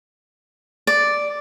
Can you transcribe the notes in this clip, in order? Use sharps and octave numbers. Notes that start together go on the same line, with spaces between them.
D5